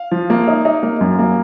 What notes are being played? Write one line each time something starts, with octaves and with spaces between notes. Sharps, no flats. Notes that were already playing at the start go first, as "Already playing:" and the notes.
Already playing: F5
F3
A#3
D#4
D#4
A#3
F#2
A#3